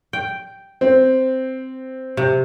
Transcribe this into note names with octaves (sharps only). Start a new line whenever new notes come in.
G5
C4
C3